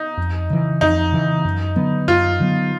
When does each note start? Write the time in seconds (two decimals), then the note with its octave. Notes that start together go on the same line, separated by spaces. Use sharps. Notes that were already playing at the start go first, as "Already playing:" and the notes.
Already playing: D#4
0.17 F2
0.50 C#3 E3
0.81 F2 D#4
1.12 C#3 E3
1.45 F#2
1.76 D3 F#3 B3
2.08 F#2 F4
2.40 D3 F#3 B3